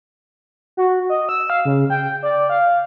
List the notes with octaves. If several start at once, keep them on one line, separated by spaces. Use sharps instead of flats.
F#4
D#5
E6
F5
C#3
G5
D5
F5